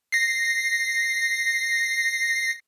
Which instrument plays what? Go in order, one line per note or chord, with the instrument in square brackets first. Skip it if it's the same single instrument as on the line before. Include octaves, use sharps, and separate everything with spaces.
[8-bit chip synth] A#6 C7